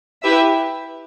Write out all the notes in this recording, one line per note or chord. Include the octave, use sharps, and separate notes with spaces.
E4 G4 B4 E5